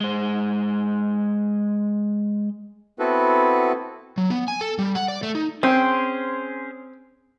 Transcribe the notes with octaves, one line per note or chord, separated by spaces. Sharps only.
G#3 C5
B3 C4 E4 F#4 A4 B4
F#3
B3
G#5
A4
G3
F#5
D5
A3
D#4
C4 C#4 G#4 C5